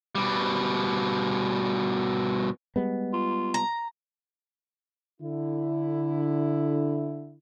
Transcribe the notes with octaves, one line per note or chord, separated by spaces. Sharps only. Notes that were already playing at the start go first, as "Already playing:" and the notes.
B2 G3
G3 G#3 B3
F4
A#5
D3 E4